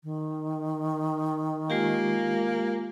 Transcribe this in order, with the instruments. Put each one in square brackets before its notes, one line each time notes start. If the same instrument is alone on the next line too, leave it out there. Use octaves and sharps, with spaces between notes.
[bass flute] D#3
[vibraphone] G#3 F4 G4 [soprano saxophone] A#3